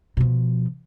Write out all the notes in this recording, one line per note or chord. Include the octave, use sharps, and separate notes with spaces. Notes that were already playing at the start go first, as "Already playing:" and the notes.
B2 F3